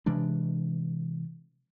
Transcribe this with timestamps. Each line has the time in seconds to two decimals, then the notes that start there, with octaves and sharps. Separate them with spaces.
0.06 C3 E3 G#3 D4